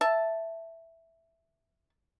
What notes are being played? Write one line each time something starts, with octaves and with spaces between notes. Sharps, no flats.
E5 A5